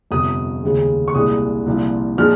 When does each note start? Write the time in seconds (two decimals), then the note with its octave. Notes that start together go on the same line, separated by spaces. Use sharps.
0.11 G1 F2 C3 D#6
0.63 D#2 C#3 G#3
1.08 C#6
1.14 C2 A#2 G#3 D#6
1.66 C2 A#2 F3
2.18 A#2 F3 G#3 F6